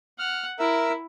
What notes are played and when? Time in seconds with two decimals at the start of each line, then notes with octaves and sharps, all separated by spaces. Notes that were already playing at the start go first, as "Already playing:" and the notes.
0.19 F#5 F6
0.59 E4 A#4 E5 E6